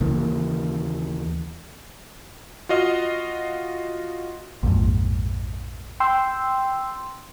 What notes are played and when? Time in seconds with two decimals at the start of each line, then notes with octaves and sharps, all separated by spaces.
0.01 D#2 C#3 E3 A#3
2.69 F4 F#4 D#5 F5
4.63 A#1 F2 G#2
6.00 G5 C6 E6